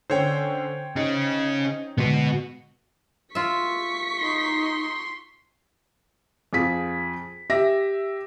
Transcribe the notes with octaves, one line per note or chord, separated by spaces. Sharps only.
D3 C#4 C5 C#5 G5
C#4 D#4 G#4
A2 D3 G#3 B3 F#4
F4 E5 C#6 B6
D#4 C6
F2 F4 G#4 B6
G4 E5 A#6